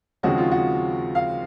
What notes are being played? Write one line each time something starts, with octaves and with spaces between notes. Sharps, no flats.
D#2 C#3 F3 G#3 C4 F#4
F4
F#4
F5